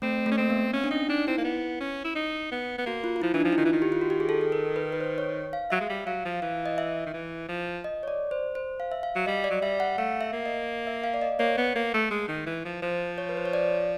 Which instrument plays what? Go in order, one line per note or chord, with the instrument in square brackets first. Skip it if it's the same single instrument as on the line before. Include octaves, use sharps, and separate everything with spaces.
[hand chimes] A3 [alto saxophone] C4
[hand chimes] A3
[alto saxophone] C#4
[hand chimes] A#3 [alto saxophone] C4
[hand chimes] B3
[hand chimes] C4 [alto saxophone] C#4
[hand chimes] D4
[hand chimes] C#4 [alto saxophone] D#4
[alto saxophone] D4 [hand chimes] D#4
[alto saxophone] C4 [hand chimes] E4
[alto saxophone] A#3
B3
C#4
E4
D#4
B3
B3
[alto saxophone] A#3 [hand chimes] F#4
[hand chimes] F4
F4
[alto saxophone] F3 [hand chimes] E4
[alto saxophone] E3 [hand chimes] D4
[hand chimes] D#4
[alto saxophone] F3
[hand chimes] E4
[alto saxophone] D#3 [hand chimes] F4
[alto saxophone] E3
D#3
[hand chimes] G4
F4
F#4
G4
G#4
A4
A4
A#4
B4
B4
C5
C#5
F5
[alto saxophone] F#3 [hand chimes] E5
[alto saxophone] G#3
G3
[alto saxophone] F#3 [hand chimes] F5
[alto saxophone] F3
[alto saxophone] E3 [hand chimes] F5
[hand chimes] D#5
E5
[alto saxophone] D#3
E3
F3
[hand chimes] D#5
C#5
D5
C5
C5
F5
E5
F5
[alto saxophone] F#3
[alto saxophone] G3 [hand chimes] D#5
[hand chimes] D5
[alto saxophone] F#3
[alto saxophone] G3 [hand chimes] E5
[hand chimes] F#5
[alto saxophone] A3 [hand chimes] F5
[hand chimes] E5
[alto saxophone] A#3
[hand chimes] D#5
E5
F5
D5
D#5
[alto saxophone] A#3 [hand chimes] C#5
[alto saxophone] B3
A#3
A3
G#3
D#3
E3
F3
[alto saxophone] F3 [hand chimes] C5
[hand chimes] C#5
B4
C5
C#5
D5